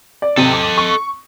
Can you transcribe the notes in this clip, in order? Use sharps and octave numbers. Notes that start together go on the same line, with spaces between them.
D5
C3 A4 D#5
D6
C#6